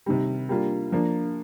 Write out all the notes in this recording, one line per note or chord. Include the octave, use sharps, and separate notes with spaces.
C3 D#3 G3
G3 A#3 D4 F4
F3 A#3 D4